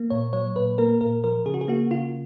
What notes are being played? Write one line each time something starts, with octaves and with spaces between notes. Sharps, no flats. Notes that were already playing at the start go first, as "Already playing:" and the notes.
Already playing: A#3
A#2 C#5
F#3 C#5
A#2 B4
A#3 A#4
A#2 A#4
F3 A#4
C#3 G#4
F#4
G#4
A#3 F#4
C#3 F4